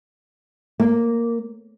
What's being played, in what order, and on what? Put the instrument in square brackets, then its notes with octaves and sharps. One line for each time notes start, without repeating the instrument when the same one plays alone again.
[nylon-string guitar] A#3